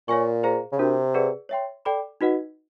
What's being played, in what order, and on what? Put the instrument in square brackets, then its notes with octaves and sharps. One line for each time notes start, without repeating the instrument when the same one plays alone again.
[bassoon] A#2 [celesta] C#5 F5 G#5 C#6
[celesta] G#4 C5 F5 A#5
[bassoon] C#3
[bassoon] C3 [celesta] D4 F#4 A#4
[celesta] G#4 B4 D5 F#5
C#5 E5 G5 C6
A4 D5 G5 B5 D6
D#4 F#4 B4 D#5 F#5